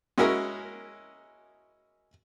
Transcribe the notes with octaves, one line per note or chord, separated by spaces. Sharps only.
G#3 C#4 E4 F#4 G#4 A#4